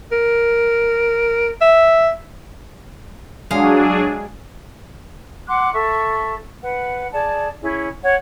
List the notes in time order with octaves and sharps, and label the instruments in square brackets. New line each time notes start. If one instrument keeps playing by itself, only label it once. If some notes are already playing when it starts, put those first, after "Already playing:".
[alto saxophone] A#4
E5
[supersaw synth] F#3 D4 G#4 [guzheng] G#3 F5
[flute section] F#5 C6 D6 F#6
A4 E5 C#6
B4 F#5
G#4 D5 A5
C#4 E4 G#4
C#5 F#5